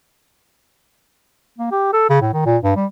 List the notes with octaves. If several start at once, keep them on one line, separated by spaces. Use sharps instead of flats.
A#3
G4
A4
C#3
A2
D#3
A#2
G2
G3